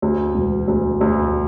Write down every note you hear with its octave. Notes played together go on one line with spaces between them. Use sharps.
D2
E1
D2
D2